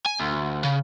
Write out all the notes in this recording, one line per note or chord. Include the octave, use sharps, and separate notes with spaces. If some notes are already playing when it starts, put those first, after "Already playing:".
G#5
D2
C#3